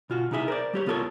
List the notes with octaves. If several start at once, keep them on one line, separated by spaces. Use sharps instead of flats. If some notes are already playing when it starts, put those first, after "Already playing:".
B2 F4 F#4
C3 D#4 E4 G#4 E5
A#4 C5 D5
G3 G4 C#5
C2 B3 F4 A4 A#4 C#5